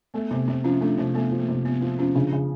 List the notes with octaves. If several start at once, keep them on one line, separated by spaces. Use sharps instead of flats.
A3 B3
C3 B3
C3 C4
F3 C#4
A3 D4
C3 C4
A3 B3
F3
A#3
C3
C3 B3
F3 C4
F3 C#4
C#3 D4
C#3